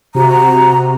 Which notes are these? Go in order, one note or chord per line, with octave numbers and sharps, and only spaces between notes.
C3 F#4 A#5